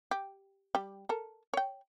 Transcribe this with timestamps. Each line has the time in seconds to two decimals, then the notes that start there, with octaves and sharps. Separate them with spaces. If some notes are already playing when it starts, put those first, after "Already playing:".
0.11 G4
0.75 G3 G4
1.09 A4 A#4
1.54 C#5 G5